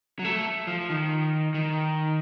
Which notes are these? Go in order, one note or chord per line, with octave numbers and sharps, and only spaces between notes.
F#3
A3
F3
D#3
D#3